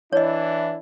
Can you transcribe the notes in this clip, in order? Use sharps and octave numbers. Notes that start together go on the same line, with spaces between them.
E3 D4 E4 C#5 D#5